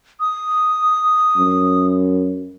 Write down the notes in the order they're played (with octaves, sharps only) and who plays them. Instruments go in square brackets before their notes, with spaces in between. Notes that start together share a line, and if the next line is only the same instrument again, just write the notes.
[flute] D#6
[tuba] F#2